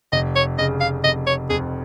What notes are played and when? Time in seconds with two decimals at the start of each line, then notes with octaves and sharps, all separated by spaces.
0.12 F1 D#5
0.36 C#5
0.58 C#3 D#5
0.81 F5
1.04 F1 D#5
1.27 C#5
1.50 F2 G#4